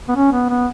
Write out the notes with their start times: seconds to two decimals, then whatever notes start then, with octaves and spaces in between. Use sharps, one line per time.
0.08 B3
0.16 C#4
0.33 B3
0.49 B3